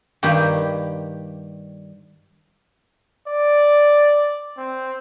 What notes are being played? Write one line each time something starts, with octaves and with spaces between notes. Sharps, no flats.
G2 D#3 A#3 D#4 G4 B5
D5
C4